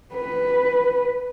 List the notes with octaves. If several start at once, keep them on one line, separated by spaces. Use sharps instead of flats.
B4